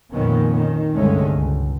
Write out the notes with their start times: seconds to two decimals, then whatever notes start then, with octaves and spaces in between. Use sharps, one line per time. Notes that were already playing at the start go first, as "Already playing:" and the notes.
0.12 F2 A#2 D#3 A#3 B3 C#4
0.55 D#3
0.94 C2 G2 D3 G#3 A3 C#4
1.36 C#2